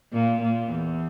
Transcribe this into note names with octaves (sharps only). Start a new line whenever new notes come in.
A#2
A#2
E2